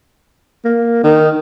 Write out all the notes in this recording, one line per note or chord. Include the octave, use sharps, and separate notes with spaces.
A#3
D#3